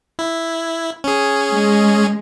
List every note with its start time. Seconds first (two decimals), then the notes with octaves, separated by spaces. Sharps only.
0.19 E4
1.04 C#4 G#4
1.51 G#3